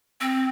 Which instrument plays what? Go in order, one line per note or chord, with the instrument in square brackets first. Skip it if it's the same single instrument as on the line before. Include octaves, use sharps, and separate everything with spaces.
[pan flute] C4